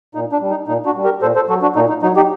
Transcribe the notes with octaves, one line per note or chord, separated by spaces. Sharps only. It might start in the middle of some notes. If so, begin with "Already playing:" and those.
A#2 D#4
D4
G3
D#4
A#2 D#4
D4 F#4
G3
G4 A#4
A#2 A4 C5
A4 C5
F#3 F#4 A4
D4 F#4
A#2 D#4
D#4
F#3 D#4
D#4 G4